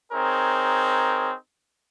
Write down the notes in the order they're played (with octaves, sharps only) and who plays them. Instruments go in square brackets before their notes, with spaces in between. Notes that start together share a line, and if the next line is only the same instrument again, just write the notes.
[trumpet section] C4 D#4 G#4 A#4 C#5